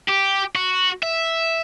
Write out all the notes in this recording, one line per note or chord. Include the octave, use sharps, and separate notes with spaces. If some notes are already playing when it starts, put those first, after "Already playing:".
G4
F#4
E5